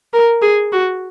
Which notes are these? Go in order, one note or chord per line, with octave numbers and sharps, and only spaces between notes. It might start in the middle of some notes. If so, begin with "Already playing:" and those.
A#4
G#4
F#4